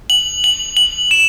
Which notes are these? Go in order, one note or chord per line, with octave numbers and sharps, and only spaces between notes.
F#7
F#7
F#7
E7